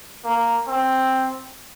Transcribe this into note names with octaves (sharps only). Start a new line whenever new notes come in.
A#3
C4